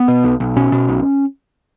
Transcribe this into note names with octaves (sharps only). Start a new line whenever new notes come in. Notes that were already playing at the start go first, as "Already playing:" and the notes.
Already playing: B3
B2
B1
B1
B2 C#4
B2
B1